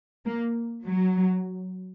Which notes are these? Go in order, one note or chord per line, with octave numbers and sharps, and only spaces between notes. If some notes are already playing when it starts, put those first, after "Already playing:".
A#3
F#3